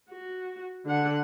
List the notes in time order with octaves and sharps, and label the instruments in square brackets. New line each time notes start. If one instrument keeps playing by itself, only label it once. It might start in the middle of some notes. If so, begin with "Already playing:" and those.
[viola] F#4
D3 F#5